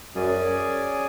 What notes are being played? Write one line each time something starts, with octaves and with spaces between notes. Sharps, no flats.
F#2 C#4 G#4 D5 G#5